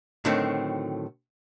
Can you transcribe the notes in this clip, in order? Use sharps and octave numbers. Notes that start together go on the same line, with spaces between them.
A2 D3 D#3 F#3 A3 C4